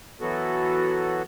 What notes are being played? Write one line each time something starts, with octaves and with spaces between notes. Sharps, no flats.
E3 F#3 B3 F#4 A4